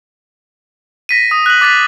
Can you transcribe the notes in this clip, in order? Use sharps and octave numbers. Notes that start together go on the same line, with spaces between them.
A#6 B6 D#7
D#6
F#6 A#6 F#7
D6 A6 B6